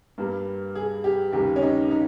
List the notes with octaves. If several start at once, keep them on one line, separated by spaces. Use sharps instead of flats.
G2 G3 A#3
G#4
G4
D#2 C#3 G3 A#3 G4
C#4
D#4
D#4